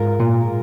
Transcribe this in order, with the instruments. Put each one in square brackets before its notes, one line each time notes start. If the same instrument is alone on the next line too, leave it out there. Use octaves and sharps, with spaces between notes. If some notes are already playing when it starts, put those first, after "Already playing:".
Already playing: [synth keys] G#2 G#3 F4 A#4
[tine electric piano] A#2